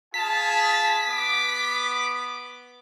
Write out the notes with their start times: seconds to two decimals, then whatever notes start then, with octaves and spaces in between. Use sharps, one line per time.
0.14 F4 G#4 A5 B6
1.08 B3 D6